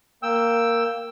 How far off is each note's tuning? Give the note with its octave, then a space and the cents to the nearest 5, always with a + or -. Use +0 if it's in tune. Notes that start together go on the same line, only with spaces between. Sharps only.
A#3 -5 G5 +0 E6 +0